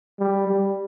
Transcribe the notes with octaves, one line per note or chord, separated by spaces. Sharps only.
G3
G3